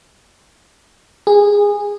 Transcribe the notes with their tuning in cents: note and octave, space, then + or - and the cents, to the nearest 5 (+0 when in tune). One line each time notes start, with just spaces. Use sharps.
G#4 -20